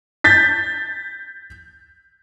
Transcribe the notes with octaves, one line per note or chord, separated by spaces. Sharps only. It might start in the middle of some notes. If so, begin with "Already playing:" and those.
G6 A6 B6